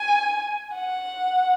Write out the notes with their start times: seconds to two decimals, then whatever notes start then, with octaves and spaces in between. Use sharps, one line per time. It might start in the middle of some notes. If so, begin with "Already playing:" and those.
Already playing: G#5
0.75 F#5